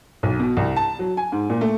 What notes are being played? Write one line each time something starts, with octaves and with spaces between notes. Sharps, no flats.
B1
B2
C2
A5
F#3
G#5
G#2
A#2
A3